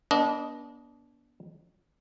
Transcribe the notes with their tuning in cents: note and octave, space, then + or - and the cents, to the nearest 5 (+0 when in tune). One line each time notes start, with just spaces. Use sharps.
B3 -35 D4 -25 D#5 +0